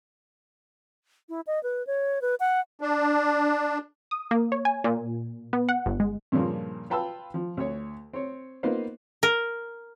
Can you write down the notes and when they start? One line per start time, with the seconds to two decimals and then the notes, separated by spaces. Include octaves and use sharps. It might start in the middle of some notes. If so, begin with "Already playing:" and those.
1.29 E4
1.47 D#5
1.63 B4
1.87 C#5
2.22 B4
2.40 F#5
2.81 D4
4.11 D#6
4.31 A#3
4.52 C#5
4.65 G#5
4.84 A#2
5.53 B3
5.69 F#5
5.86 G1
6.00 G#3
6.32 G2 A#2 C#3 F3 A#3
6.90 F4 B4 G5 A5 B5 E6
7.34 F3
7.57 D2 C#5
8.14 C4 C#5
8.63 A#3 B3 D#4 F4 B4 C5
9.23 A#4